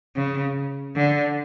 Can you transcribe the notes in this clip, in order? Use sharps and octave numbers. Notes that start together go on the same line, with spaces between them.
C#3
D3